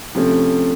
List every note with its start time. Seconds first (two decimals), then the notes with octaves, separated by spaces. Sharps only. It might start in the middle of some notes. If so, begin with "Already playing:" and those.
0.15 C3 F3 A3 C#4